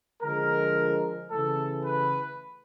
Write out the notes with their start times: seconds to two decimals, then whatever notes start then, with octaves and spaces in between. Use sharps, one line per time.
0.22 D3 F3 G#3 A#4
1.30 C#3 E3 A3 A4
1.84 B4